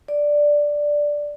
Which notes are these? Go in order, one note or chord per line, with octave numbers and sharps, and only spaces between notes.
D5